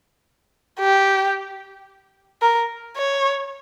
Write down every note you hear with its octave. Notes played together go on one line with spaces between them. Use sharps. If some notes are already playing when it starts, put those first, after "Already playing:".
G4
A#4
C#5